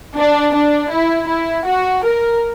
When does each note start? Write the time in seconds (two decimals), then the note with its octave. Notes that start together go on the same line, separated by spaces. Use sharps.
0.17 D4
0.55 D4
0.92 E4
1.28 E4
1.66 F#4
2.04 A#4